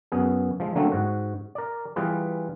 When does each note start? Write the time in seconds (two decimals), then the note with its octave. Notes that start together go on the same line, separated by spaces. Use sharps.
0.12 F#2 B3 G#4
0.60 F3 G#3
0.75 D3 F#3 A3 A#3 C4
0.92 G#2 F#4
1.55 A#4 D5
1.96 E3 G3 F4 G#4 B4